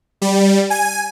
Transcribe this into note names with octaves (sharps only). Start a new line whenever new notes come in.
G3
G#5